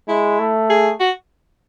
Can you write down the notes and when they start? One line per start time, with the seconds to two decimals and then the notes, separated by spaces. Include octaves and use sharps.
0.08 G#3 E4
0.39 A3
0.70 G#4
1.00 F#4